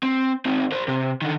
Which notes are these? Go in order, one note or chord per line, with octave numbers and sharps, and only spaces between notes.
C4
D#3 C4
A#4 C5
C3
D3 D#3